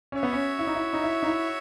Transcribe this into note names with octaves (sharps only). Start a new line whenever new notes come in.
C#4 F#4 C#5 E5
B3
C#4
E4
D#4
E4
D#4
E4
D#4
E4